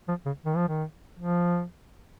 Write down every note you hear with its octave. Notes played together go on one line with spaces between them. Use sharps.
F3
C#3
D#3
F3
D#3
F3